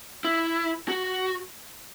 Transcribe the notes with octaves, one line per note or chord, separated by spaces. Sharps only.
E4
F#4